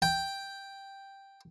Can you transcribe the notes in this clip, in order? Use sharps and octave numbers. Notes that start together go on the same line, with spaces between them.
G5